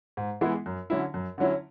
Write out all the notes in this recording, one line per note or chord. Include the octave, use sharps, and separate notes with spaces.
G#2
E3 G#3 B3 E4
F#2
D3 F#3 C#4 E4
F#2
D3 F#3 C#4 E4